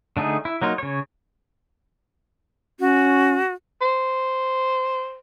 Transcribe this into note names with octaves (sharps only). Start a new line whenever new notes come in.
D3 A3 D#4 G#4
E4
F#3 A#3 D#4 F4
C#3 C#5
C#4 F#4
C5